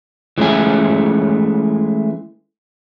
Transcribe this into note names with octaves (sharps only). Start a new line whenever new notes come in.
E3 G#3 A3 C#4 G#5